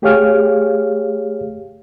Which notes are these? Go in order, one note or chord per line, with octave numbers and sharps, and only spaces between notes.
A3 G4 G#4 C#5 F5 F6